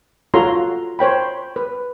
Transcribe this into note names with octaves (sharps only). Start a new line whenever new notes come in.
F4 F#4 A4 C#5 A#5 C6
C5 C#5 G5 B5
B4